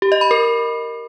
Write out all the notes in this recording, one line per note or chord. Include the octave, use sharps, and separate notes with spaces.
G4
D#5
B5
A#4